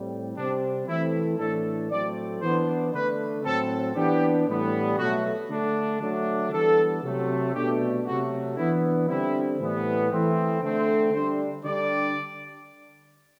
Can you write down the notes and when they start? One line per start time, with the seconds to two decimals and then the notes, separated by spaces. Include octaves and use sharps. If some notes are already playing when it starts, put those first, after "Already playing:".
Already playing: A2 G3 C4
0.37 C3 G3 C4 D4
0.88 E3 A3 C4 E4
1.39 A2 E3 A3 D4 A4
1.91 A2 F#3 A3 C4 D5
2.42 E3 B3 D4 C5
2.93 D3 A3 D4 B4
3.44 A2 F#3 C4 A4
3.95 E3 B3 D4 G4
4.47 A2 E3 G3 B3
4.98 B2 F#3 A3 F#4
5.49 D3 A3 D4
6.01 D3 F#3 A3 D4
6.51 E3 G3 B3 D4 A4
7.03 C3 F#3 A3
7.54 B2 A3 D4 G4
8.05 C3 F#3 A3 F#4
8.57 E3 B3 D4 E4
9.08 D3 G3 C4 E4
9.60 A2 E3 G3 B3
10.11 E3 A3 C4
10.62 D3 A3 C4
11.13 D3 G3 D4 C5
11.64 D3 G3 D4 D5